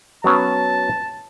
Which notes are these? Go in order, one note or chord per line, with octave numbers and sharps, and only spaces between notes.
F#3 B3 C#4 A5